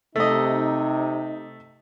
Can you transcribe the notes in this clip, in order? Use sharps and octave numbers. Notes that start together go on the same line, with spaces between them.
C3 A3 D#4 D#5